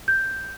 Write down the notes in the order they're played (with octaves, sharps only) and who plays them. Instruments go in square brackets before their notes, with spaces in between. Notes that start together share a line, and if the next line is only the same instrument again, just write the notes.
[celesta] G6